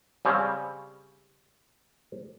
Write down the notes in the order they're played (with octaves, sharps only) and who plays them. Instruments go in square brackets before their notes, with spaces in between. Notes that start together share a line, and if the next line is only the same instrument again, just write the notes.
[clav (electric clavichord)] C#3 G3 C4 C#4